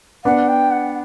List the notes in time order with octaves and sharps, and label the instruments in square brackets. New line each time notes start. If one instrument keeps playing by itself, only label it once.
[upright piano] B3 D4 [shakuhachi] F#5
[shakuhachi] G5
F#5